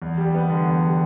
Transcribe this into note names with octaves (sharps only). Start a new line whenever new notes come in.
E2
G3
B3
D3
E2
G3